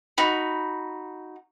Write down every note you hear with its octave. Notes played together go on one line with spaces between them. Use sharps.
D#4 F#4 B5